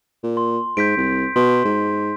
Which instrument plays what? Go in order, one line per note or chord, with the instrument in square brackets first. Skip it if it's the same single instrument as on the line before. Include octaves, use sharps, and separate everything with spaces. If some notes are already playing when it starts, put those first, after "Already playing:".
[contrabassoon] A#2
[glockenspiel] C6
[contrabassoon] G#2 [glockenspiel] G6 B6 D7
[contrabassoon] C2
[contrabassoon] B2 [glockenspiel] C6
[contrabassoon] G#2